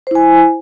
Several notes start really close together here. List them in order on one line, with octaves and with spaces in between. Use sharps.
C5 E4 G#5